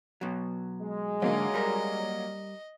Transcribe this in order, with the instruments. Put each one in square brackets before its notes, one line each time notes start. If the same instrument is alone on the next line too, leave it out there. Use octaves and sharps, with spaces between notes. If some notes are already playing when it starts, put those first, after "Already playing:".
[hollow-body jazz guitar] B2 F#3
[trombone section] G#3
[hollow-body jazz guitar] G#2 D3 [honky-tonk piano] F#3 A#3 [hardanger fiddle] D#5
[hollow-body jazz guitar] G3 A#4